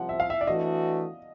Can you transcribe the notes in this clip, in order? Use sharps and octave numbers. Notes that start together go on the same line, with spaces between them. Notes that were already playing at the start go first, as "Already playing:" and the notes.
Already playing: C2 C3 F3 F#5
E5
F5
E5
D5
E3 A3 D4 F#4 D#5